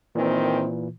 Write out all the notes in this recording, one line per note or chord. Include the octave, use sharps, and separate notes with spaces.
E2 A#2 D#3 E3 C4